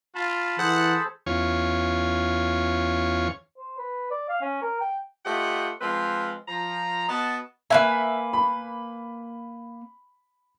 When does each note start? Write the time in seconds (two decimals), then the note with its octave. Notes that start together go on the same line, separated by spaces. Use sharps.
0.15 F4 A5 B5
0.58 E3 G#4 A4 C5 F#5
1.26 E2 C#4 F4 C#5
3.57 C5
3.78 B4
4.11 D5
4.29 F5
4.42 C#4
4.62 A#4
4.81 G5
5.25 A3 F4 G4 C5 D#5 F#5
5.81 F3 G#3 C4 B4 F5
6.48 F3 A#5
7.09 B3 F#4 D#5 F#5 A5
7.70 A#3 B4 E5 G#5
8.33 B5